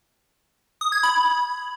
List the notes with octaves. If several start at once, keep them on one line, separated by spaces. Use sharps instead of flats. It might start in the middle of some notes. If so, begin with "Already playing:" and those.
D#6
G#6
B5